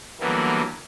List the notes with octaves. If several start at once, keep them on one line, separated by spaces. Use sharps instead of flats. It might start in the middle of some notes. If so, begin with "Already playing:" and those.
D3 E3 F#3 G3 A#3 B3